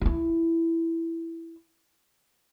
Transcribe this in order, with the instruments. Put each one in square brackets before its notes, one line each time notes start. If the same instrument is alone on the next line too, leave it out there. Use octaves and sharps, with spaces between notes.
[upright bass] E4 F4